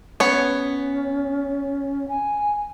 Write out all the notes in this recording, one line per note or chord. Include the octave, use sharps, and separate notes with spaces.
B3 C#4 C#5
G#5